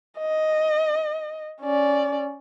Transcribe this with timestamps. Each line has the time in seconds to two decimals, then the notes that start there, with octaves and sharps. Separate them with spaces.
0.19 D#5
1.61 C#4 D5